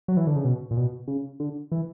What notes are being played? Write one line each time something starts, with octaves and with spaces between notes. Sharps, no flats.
F#3
E3
D3
C#3
B2
A#2
B2
C#3
D3
E3